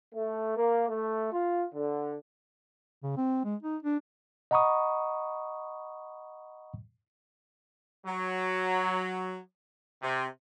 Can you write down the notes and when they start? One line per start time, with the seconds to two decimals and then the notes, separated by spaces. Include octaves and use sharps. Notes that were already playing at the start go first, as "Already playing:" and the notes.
0.13 A3
0.57 A#3
0.89 A3
1.33 F4
1.74 D3
3.03 C#3
3.17 C4
3.45 G#3
3.63 D#4
3.83 D4
4.51 D#5 F#5 A#5 B5 C#6 D#6
8.06 F#3
10.03 C3